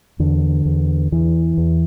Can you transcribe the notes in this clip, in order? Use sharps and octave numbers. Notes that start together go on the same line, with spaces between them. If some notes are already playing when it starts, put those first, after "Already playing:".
E2 D3
E2
E2 E3
E2